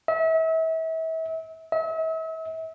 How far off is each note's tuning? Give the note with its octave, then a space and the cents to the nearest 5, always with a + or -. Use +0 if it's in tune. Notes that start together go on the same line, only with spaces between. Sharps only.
E5 -35
E5 -40